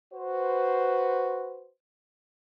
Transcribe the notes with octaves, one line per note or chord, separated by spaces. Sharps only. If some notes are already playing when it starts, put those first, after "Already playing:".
F#4 B4 C5